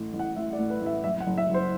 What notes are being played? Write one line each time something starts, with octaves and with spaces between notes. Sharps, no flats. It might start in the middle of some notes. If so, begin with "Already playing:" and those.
Already playing: A1 A2
A1
F#5
A1 E5
D5
A2
B4
A1
E5
F#1 E5
F#5
F#1
E5
F#1
C5